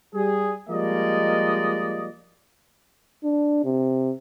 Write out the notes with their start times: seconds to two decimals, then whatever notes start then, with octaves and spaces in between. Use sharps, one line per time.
0.14 G3 G#4
0.69 F3 G3 G#3 A#3 D5 D#5
3.24 D4
3.65 C3